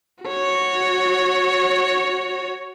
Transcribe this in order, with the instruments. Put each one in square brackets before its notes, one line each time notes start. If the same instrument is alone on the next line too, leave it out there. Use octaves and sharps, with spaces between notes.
[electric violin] F#4 C#5